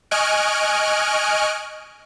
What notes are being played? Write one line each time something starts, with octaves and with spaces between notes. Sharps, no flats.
D#5 G#5 C#6 F6 F#6 D7